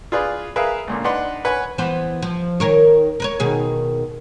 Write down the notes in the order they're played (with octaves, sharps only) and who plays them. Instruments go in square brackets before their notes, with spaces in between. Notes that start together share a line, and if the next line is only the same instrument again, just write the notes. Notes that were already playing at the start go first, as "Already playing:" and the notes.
[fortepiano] F4 G#4 B4 D5
G#4 A#4 B4 E5 F5
C#2 A#2 D3
D4 D#4 B4 F#5 C6
B4 C#5 F#5 G#5 B5
[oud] E3 B3 C5
F3
D#3 A#4 C#5
A#4 B4 C#5
B2 D#3 G#4